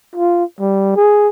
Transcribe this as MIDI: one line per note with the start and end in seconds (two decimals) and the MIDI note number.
0.16 0.44 65
0.60 0.91 55
0.96 1.28 68